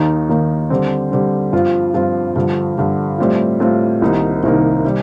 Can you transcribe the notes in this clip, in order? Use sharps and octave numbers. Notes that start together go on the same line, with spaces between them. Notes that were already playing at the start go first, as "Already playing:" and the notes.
Already playing: D#2 D#3 A#3 D#4
D#2 D#3 A#3 D#4
D3 G3 C4
D3 G3 C4
G2 F3 C4 F4
G2 F3 C4 F4
G2 D3 F3
G2 D3 F3
A2 G3 C4 F4
A2 G3 C4 F4
C2 C3 D#3 A#3 D#4
C2 C3 D#3 A#3 D#4
C3 G3